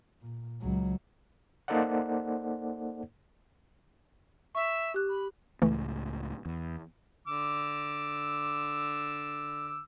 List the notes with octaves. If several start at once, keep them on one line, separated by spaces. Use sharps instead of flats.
A#2
C#2 F#3
A#3 D#4 A4 C5 D5 F#5
E5 C#6
G4 F#6
B5
C#2 A2 E3 A3
E2
D3 D6 E6